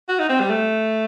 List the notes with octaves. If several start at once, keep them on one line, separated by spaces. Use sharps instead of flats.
F#4
D#4
C4
G3
A3